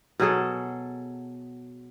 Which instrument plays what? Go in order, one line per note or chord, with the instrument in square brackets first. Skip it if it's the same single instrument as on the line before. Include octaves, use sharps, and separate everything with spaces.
[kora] B2 F#3 G#4 A4